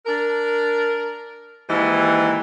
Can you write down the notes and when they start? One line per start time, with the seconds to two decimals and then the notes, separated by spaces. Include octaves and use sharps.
0.06 D4 A#4
1.69 D#2 G#2 E3